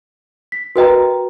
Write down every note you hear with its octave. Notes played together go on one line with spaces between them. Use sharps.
B6
F#4 A#4 B4 D#5 G5 A#5